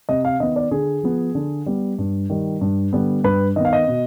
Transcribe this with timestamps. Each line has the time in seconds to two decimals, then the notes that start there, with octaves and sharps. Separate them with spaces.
0.09 C3 D#5
0.25 F5
0.40 D#3 B3 D#5
0.56 D5
0.71 D3 G#4
1.03 F3 B3
1.35 D3
1.66 G3 B3
1.99 G2
2.30 D#3 G3
2.61 G2
2.93 D3 G3 B3
3.24 G2 B4
3.56 D#3 D#5
3.60 B3 F5
3.73 D#5
3.88 B2